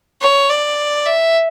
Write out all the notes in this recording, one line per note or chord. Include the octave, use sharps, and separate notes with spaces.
C#5
D5
E5